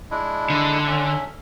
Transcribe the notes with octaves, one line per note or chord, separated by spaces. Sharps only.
G#3 D4 E4
D3
C#4 E5